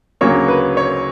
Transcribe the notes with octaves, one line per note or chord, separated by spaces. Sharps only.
D2 C#3 F#3 A#3 C#5
B4
C#5